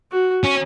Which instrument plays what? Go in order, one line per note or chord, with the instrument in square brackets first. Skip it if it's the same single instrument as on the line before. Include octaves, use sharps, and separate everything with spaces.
[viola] F#4
[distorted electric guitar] C#4